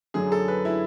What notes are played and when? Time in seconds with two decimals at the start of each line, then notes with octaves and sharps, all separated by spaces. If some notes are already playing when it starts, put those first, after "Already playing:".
0.14 F#2 D3 F#3 G#4
0.32 A4
0.48 B4
0.65 E4